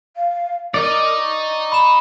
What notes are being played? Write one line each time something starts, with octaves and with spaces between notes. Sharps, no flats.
F5
D#4 A#4 D5 D#5
C#6
B5 E7